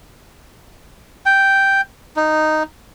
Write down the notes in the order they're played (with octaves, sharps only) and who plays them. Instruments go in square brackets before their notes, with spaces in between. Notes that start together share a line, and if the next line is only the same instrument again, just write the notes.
[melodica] G5
D#4